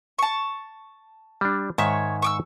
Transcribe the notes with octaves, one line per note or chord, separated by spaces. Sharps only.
A5 C#6
G3 D4
G#2 D#3 C#5 E5 C#6
C#6 D6 E6